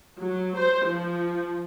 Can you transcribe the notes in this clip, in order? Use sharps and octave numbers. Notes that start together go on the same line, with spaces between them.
F#3
C5
F3